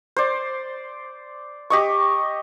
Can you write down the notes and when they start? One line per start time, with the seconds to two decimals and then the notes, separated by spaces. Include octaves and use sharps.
0.16 C5 D5
1.70 G4 D#5 C#6